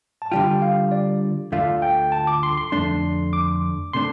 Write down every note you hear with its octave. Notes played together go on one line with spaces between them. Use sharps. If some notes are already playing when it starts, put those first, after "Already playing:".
A5
D3 G3 F4 G5
F5
D5
D2 D3 A3 F4 F5
G5
A5
D6
C6
C6
F2 D3 A3 D4 C6
D6
C3 A3 D4 C6